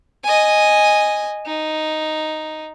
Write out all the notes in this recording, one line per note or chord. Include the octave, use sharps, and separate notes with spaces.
D#5 G#5
D#4